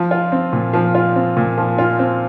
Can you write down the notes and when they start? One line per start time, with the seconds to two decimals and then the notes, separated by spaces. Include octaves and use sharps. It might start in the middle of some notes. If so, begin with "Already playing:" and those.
Already playing: F3
0.11 F4
0.32 C4
0.53 A#2
0.73 F3
0.95 F4
1.16 C4
1.37 A#2
1.58 F3
1.78 F4
1.99 C4